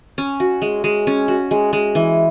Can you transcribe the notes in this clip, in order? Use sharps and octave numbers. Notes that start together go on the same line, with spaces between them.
C#4
F#4
G#3
G#3
C#4
F#4
G#3
G#3
E3